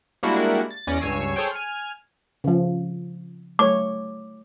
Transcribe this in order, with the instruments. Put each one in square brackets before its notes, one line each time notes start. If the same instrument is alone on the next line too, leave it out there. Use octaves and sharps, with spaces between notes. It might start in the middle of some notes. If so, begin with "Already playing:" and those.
[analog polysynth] G3 G#3 A#3 D4 E4 F#4
A6
E2 C#4 D5 A#6
C#2 G2 C#5 G#5 E6 C7
G#4 A4 C5 C#5 G5
G#5 F6
[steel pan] C#3 F3
[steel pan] A3 C#5 [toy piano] D6